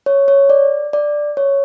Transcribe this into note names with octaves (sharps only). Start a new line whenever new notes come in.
C#5
C#5
D5
D5
C#5